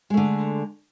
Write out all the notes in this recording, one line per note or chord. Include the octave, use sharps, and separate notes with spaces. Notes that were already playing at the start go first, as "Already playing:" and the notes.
D3 G#3 A3